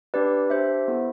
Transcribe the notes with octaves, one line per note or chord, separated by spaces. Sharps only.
D4 G4 B4 D5
D4 G4 C5 E5
B3 E4 A4